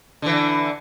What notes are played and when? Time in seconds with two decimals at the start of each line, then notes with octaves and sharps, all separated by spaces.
0.22 D3 E3